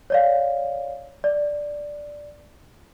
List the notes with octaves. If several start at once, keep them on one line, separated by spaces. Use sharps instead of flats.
C#5 D5 F5
D5